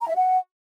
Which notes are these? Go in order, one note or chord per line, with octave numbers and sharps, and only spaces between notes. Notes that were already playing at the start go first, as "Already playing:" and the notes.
A#5
E5
F#5